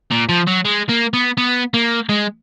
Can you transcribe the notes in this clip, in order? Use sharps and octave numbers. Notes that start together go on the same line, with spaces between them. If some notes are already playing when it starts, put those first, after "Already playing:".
A#2
F3
F#3
G#3
A#3
B3
B3
A#3
G#3